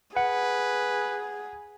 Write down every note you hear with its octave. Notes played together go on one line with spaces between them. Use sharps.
G#4 B4 F#5